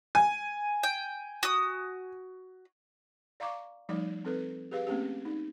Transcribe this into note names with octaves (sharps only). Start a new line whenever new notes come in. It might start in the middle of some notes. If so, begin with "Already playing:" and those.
G#5
G5
F#4 D#6
D5 F5 A#5 C#6 D6
F3 G3 A3 D#4 D5
C4 A4 B4
G4 G#4 B4 F5
A3 A#3 C4 C#4 G4
D#4